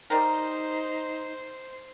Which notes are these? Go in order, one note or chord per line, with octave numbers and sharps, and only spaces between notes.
G3 D#4 G4 A#4 C5